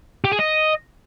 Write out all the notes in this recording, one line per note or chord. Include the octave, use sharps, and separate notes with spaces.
G4
G#4
D#5